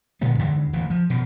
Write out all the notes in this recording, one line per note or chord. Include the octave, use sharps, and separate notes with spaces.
A#2 D3 G#3 B3
E2 D3 E3 G#3
D1 A1 D#2 E3
F3
B2 D#3